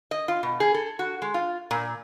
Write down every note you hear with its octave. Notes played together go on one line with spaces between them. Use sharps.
D#5
F4
B2
G#4
A4
F#4
G#3
F4
A#2